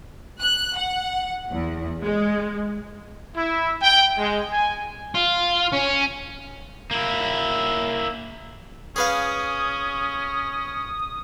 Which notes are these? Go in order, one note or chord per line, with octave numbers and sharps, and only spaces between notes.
F#6
F#5
E2
G#3
E4
G5
G#3
G#5
F4
C#4
A#3 E4
C#4 G#4 B4 F5 D#6